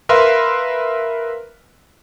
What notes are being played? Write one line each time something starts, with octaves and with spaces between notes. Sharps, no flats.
A#4 B4 E5 F5 C6